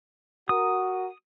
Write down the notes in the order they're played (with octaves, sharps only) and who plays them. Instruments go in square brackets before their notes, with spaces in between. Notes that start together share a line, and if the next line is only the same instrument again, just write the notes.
[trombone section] F#4 A#4 [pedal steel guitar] D#6